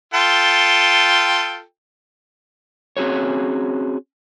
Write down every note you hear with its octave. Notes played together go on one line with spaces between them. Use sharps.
F4 A4 G5
C4 C#4 F#4 G#4 C#5